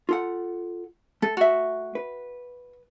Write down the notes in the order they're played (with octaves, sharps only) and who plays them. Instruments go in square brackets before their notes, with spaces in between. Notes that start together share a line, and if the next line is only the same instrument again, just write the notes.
[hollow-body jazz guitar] F4 A4 F#5
[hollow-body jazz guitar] A3 [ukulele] A4
[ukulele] F#4 E5
[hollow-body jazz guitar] B4